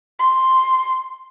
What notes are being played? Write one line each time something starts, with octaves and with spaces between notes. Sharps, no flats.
C6